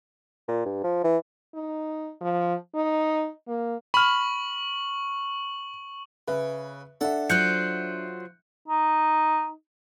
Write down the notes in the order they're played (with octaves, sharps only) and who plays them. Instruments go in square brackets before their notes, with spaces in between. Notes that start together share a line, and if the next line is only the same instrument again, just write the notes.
[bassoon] A#2
G2
F3
E3
[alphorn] D#4
F3
D#4
A#3
[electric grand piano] B5 F6 [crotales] C#6 F#7
[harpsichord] C#3 [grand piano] B4 E5
[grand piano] D4 E5 [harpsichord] A4 F#5
[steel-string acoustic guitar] F#3 F4 C5 [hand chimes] F#6 G6 C#7
[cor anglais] D#4